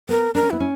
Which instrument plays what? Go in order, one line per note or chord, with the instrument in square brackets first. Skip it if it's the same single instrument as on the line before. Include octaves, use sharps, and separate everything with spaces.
[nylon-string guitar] B3 [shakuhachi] A#4
[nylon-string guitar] D4 [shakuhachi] A#4
[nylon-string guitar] C#4
[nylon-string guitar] B3 [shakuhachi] E4
[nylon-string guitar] C#4